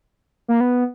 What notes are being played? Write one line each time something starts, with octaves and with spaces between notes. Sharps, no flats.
A#3
B3